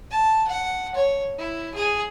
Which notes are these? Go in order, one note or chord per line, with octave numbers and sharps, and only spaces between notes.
A5
F#5
C#5
E4
G#4